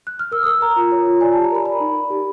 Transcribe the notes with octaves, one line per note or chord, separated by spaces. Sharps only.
F#6
F6
A#4 E6
D#6
A#4 E6
A#4 A#5
F4
C#5
F4
D5 G#5
A5
G4
A#5
A#4 B5
D5 B5
D#4
A#4
G4